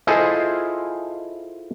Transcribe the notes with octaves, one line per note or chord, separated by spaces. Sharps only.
E4 F4 G#4 A4 C5 D#5